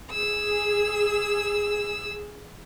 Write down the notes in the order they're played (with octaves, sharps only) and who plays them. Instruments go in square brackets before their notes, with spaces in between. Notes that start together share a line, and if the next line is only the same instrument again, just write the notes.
[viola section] G#4 [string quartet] E6